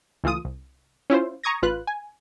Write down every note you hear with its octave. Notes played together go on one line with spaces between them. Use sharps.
C#2 E3 A3 F4 D#6
C2
C#4 E4 F4 C5
A#5 C#6 D#6 G#6 A#6
A1 F4 B4 F#6
G#5